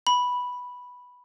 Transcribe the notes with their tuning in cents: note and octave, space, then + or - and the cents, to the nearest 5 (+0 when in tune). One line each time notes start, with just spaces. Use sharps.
B5 -5